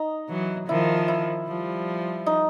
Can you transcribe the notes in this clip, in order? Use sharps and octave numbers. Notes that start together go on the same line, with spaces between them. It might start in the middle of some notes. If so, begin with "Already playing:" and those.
Already playing: D#4
E3 F#3
D#3 F3 E4
E4
F3 G3
D#4